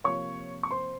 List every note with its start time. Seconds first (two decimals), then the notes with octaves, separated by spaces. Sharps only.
0.04 C3 F3 A#3 C#5 C#6
0.63 C#6
0.71 C5 C6